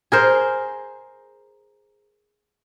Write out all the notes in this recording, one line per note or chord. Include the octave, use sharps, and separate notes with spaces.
G#4 A#4 C5